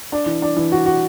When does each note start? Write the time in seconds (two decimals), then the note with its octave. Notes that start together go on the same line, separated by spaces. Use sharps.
0.12 D4
0.26 E3
0.42 D4
0.57 E3
0.72 F#4
0.86 F#4